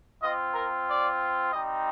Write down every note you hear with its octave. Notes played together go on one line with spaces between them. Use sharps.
C4 F4 D#5
A#4
D5
G3 C4 D#4 D#5